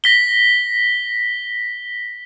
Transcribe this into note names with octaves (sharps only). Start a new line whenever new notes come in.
A#6 B6 G7